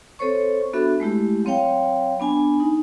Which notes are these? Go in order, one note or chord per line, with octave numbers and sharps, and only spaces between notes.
C4 A4 C5 C#5 C#6
B3 D4 F#4 A4 E5
G#3 A3 E4 G4
F#3 C4 C#5 F5 G5
B3 D4 G#5
D#4